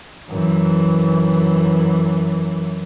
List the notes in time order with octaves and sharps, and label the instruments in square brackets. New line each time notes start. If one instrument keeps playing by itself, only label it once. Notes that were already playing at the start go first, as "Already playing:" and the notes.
[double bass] F#2 E3